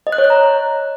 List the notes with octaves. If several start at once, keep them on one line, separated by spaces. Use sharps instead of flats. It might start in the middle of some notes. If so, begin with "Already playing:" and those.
D#5
F#6
C#5
F#6
A#5